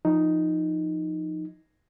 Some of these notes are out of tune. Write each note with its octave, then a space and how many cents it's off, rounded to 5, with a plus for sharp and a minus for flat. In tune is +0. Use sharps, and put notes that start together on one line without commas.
F3 +0 D#4 +0